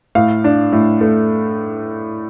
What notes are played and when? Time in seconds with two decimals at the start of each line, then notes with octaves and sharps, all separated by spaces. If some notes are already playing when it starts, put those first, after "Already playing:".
0.15 A2 F5
0.44 D4
0.72 A2
1.01 A3